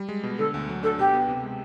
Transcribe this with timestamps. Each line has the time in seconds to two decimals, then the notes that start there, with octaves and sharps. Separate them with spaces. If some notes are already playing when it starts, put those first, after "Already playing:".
Already playing: G3
0.09 G#3
0.23 B2
0.38 D3 A4
0.54 D2
0.69 F#3
0.83 D4 A4
0.98 B2 G4
1.14 B3
1.28 C3
1.43 G#3